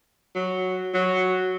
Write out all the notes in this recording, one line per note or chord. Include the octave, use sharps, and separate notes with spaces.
F#3
F#3